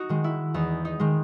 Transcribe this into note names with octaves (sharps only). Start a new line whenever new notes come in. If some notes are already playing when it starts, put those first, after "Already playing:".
Already playing: D#4 F#4
D#3 G#3
E4
E2 D#4
D#4
D#3 G#3